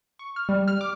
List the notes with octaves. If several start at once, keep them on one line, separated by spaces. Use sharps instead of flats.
C#6
F6
G3
F6
D6